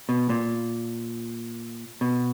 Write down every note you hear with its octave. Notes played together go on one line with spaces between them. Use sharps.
B2
A#2
B2